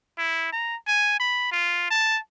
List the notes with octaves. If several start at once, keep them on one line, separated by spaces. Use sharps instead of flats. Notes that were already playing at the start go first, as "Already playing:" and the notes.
E4
A#5
G#5
B5
F4
A5